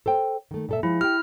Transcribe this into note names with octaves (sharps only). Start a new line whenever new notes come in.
A4 C5 G5
D#3 A3
A#2 A4 E5
F3 G#3 E4
G4 F#5 G5 F6